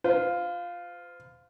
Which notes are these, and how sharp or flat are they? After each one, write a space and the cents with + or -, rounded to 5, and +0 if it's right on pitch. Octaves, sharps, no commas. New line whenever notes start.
F4 +5 C5 -40